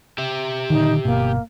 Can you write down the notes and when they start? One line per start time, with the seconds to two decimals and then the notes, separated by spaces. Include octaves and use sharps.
0.18 G4 E5
0.70 A#2 D3 D#3 D#4
1.05 G1 B2 A#3